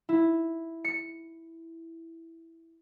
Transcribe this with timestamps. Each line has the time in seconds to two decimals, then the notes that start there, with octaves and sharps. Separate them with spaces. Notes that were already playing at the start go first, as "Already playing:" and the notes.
0.09 E4
0.84 C#7